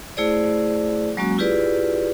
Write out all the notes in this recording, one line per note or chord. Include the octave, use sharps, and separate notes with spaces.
A3 E4 G#4 C5 D5
F#3 G#3 A#3 C#4 F#4
E4 F4 G4 G#4 B4 D5